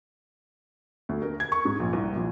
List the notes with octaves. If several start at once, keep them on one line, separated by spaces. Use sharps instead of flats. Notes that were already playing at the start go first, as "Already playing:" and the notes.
D2
A#4
G#6
C#6
G#2
A#1
C2
A#1